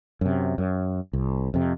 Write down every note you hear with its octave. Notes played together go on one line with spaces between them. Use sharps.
F#2 C3
F#2
C2
F2 C3